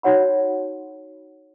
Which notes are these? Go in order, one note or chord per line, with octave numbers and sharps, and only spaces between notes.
D#4 F#4 C#5 F#5 B5